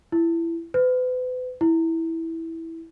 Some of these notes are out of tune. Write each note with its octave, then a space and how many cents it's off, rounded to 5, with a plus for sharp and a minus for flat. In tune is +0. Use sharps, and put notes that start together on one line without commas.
E4 +20
B4 +40
E4 -10